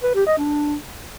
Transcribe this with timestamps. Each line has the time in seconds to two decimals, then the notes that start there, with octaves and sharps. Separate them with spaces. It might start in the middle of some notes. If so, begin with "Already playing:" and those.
0.03 B4
0.15 G4
0.26 D#5
0.38 D4